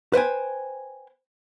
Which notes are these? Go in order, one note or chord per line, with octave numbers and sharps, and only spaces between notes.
B4 C5 G5 G#5